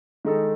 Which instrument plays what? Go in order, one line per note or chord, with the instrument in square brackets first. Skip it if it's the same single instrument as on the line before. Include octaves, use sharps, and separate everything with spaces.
[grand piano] D#3 G#3 D#4 A4